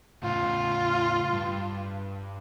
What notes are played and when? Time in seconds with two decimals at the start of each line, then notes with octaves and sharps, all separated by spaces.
0.23 A2 C#3 F4
1.33 G2